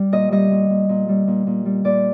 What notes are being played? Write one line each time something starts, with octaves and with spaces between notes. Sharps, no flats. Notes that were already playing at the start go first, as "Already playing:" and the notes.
Already playing: G3
A#2 D#5
G3 D#5
A#2
A#2
A#2
G3
A#2
A#2
G3
A#2 D5